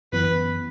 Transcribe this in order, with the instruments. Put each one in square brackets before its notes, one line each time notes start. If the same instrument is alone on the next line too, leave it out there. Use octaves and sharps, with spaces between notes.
[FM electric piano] F#2 E3 B3 [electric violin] B4